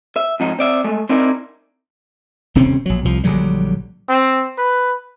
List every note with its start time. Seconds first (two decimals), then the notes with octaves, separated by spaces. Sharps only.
0.16 E5
0.40 F2 G#2 D#4
0.59 C4 D5 E5
0.84 G#3 A3
1.09 C4 D#4 E4 A#4 D5
2.55 D#1 C3 C4 C#4
2.86 A#1 F#3
3.05 C2 F3
3.24 A#1 D3 F#3 G3
4.09 C4
4.58 B4